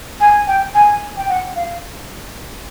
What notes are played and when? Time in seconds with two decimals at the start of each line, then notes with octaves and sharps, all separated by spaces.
0.21 G#5
0.47 G5
0.75 G#5
1.17 G5
1.29 F#5
1.56 F5